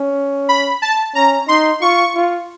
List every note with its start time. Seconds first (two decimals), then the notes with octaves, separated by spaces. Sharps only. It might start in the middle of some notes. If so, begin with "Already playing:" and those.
Already playing: C#4
0.49 B5
0.82 A5
1.15 C#4 A#5
1.48 D#4 C6
1.82 F4 C#6
2.15 F4